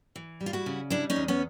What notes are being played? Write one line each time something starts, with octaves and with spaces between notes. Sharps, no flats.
E3
G3
F4
E4 F#4
C#3
G3 D4 E4
C#4 D#4
E2
B3 C#4